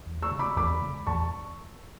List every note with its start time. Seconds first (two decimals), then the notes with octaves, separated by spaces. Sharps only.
0.06 E2
0.22 C#6 E6
0.31 C#3 G#3
0.39 B5 D6
0.56 E2 B5 D6
0.82 C#3 G#3
1.07 E2 A5 C#6